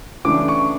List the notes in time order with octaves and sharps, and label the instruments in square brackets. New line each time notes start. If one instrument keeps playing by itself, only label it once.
[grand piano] C#3 E3 A3 D4 D6
C#6